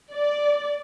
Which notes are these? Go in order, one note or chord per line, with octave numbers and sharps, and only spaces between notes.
D5